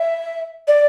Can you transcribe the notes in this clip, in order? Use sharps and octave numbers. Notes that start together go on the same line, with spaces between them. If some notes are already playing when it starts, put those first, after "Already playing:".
Already playing: E5
D5